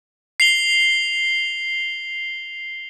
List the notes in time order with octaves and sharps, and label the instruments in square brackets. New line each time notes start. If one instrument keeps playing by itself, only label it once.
[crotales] C7 F7 G7